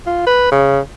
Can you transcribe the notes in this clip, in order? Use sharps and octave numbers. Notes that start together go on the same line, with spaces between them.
F4
B4
C#3